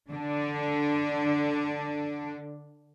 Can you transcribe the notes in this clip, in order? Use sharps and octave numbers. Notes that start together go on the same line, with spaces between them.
D3 D4